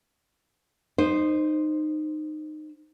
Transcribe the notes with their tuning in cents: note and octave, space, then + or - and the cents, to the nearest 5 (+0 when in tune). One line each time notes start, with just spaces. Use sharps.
D#4 -20 C5 +0